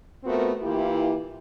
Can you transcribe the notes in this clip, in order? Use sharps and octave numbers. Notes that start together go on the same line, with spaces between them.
A3 B3 C4 F4 F#4 A#4
E3 A#3 E4 F4 G4